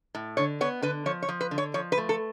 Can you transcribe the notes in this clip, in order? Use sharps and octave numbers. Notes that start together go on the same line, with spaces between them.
A2
D3 C#5
B3 C#5
D3 B4
F3 C#5
C#5
F3
B4
D3
C#5
F3 C#5
B4
A3
A4